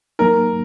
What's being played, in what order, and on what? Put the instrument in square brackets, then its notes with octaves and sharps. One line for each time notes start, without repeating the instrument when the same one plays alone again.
[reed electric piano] F#3 A#3 D#4 [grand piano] A#4